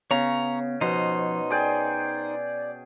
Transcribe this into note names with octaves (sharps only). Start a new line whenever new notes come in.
C#3 B3 C#5 A#5
B2 F3 D#4 C5
G#4 D5 G5